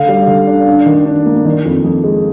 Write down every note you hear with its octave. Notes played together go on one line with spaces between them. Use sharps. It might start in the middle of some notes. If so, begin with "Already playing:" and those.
Already playing: D3 F5
G3
D3
D4
D4
D#3
D4
A#3
D#3
F2
F2
G#3